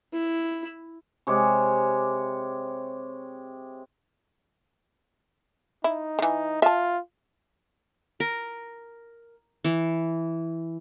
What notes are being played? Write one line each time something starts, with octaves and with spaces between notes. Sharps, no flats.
E4
C3 G#3 C#5 D6
D#4 E4
D#3 E3
F4 E5 A5
A#4
E3